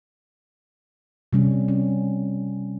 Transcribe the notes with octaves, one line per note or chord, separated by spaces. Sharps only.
C3 G3 C#4
C#4